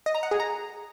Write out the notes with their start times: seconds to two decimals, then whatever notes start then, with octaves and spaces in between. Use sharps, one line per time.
0.06 D#5
0.15 A#5
0.23 F#5
0.31 G#4
0.40 A#5